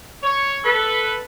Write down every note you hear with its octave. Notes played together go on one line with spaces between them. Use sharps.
C#5
A4 B4